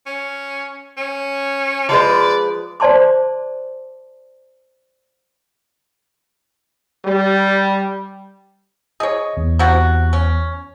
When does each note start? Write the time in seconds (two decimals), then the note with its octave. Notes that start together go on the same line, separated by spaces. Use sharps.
0.07 C#4
0.98 C#4
1.89 F3 G#3 B4 D5
2.80 C5 D5 A5 C6 D6
7.05 G3
9.00 G#4 C#5 D#5
9.37 E2
9.59 C3 F#4
10.13 C#4